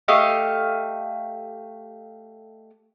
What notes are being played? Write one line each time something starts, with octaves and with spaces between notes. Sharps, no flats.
A3 G4 D#5 F5